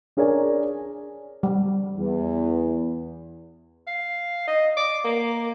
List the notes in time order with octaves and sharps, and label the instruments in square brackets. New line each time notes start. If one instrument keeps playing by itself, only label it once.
[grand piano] D4 G#4 A#4 C#5 D5 G#5
[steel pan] G3
[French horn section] E2
[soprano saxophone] F5
D#5
D6
A#3